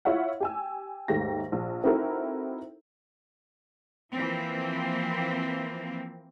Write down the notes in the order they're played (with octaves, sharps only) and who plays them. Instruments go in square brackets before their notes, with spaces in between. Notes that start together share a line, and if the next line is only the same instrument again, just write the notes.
[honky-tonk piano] E4 F4 C#5 E5 F#5
G4 G#5 E6
D#2 G#2 A3 G4 A#6
A#1
C4 D#4 E4 F#4 A4 A#4
[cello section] E3 F3 A#3 C4